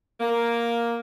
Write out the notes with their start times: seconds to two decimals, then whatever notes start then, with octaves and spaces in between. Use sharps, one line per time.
0.20 A#3